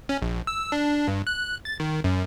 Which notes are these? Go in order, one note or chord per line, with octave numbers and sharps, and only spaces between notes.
C#4
A#1
E6
D4
G2
F#6
A6
D#3
F#2